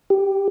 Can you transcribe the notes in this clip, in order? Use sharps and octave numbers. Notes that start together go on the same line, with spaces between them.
G4